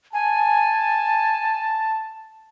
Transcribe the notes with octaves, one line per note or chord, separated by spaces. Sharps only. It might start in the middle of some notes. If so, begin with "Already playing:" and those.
G#5 A5